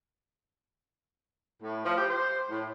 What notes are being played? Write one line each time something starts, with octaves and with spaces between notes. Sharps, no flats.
A2
F3
G4
C5
A2